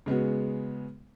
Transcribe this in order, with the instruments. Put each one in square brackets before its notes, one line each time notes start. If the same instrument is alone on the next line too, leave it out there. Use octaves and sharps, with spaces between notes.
[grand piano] C#3 G#3 B3 F#4